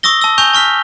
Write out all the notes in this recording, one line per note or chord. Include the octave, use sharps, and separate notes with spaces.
C#6 D#6 E6 A#6 G7
A5 E6
G#5 C#6 G6 F7 G7
A5 C#6 F6 B6